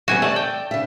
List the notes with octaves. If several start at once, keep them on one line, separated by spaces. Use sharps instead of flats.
F#3 G3 B3 F#4 G#5
A3 D5 A5
G5
C#3 E5